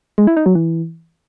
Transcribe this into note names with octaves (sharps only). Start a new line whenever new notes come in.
G#3
E4
D#4
F#3
E3